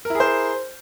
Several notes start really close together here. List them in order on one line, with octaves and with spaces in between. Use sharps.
A#4 E4 G#4 C5